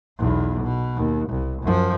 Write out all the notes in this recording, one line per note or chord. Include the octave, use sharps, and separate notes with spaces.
B1 E2
B2
D#2
C2
F#2 F3